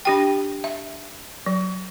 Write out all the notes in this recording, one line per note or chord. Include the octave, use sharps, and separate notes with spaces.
D4 G4 G5
E5
F#3